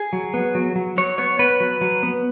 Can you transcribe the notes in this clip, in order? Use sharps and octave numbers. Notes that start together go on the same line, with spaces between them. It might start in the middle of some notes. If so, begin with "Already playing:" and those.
Already playing: G#4
F#3
B3
F#3
F#3
F#3 C#5
B3 C#5
B3 B4
F#3
F#3
B3